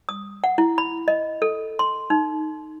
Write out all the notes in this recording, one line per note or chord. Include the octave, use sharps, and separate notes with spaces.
D#6
F#5
E4
B5
D#5
A4
C6
D#4